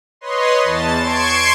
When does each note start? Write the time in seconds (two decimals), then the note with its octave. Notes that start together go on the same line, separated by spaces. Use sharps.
0.21 B4 C#5 D#5 C6
0.64 E2 A5 A6
1.01 C6 C#6 G#6 C7 D7 E7